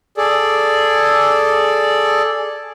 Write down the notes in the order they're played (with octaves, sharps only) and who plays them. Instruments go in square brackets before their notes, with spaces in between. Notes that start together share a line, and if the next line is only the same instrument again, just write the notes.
[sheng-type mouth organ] G#4 A4 D5